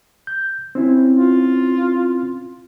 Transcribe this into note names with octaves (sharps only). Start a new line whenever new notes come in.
G6
C4 C#4 E4
F4